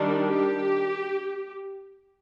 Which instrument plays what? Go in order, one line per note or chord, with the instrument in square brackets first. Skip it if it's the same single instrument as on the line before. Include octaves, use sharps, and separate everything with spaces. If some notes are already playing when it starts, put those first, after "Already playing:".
Already playing: [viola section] D#3 G3 D4
G4